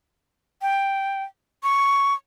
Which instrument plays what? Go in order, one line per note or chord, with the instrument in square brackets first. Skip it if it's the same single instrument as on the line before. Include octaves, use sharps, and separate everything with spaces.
[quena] G5
C#6